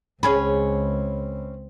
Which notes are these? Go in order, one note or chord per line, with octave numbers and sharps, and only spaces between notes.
C#2 C4 C#4 G#4 B4